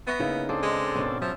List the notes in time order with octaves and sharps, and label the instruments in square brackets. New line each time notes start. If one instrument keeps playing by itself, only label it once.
[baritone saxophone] B3 [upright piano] E5 C#6 A#6
[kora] C#3 [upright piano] A#3 D#4 E4
[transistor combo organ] C4 D4 A4 [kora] G#4
[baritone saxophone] G#3 [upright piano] B4 D#5
[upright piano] G#1 B2 [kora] B3 C#4
[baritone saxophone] F3 [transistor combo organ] F#3 [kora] E5